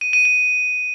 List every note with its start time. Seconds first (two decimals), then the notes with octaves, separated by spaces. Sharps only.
0.01 D#7
0.13 D#7
0.25 D#7